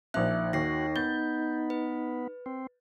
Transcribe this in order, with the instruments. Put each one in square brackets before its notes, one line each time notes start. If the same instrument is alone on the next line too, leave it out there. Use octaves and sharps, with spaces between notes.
[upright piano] A#1 A#2 [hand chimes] D#4 E5 F#6
[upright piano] D#2 [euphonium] D#4 [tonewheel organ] F#4 [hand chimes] A#6 C7
[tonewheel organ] B3 [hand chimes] G6 [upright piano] A6 G7
[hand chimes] B4
[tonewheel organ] C4